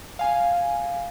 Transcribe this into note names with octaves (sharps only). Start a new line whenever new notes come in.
F5 G#5